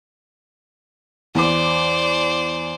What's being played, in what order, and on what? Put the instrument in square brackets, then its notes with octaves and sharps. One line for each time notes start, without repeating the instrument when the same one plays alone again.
[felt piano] E2 D6 [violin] C5 D5